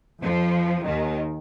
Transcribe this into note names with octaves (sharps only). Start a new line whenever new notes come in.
F2 F3
D#2 D#3